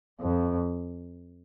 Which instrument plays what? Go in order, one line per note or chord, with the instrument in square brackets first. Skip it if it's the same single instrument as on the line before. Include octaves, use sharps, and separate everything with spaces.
[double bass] F2